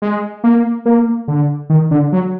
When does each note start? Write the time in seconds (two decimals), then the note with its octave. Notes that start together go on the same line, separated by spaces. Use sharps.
0.02 G#3
0.44 A#3
0.86 A#3
1.28 D3
1.70 D#3
1.91 D3
2.12 F#3